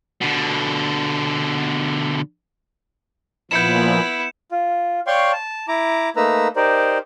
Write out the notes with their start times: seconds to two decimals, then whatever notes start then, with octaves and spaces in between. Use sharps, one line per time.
0.21 B2 D3
3.51 A#2 F3 B3 E4 G6 C#7 E7
4.52 F4
5.07 C#5 D5 F5 G5 C6 C#6
5.32 A5
5.68 E4 A#5 D6
6.16 A3 A#3 D#4 B4 A#5 E6
6.56 D#4 G4 A#4 C5 D5